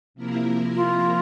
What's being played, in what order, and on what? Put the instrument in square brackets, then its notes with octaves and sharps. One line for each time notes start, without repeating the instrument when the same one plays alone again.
[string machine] C3 F3 A#3 E4 A#4
[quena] F4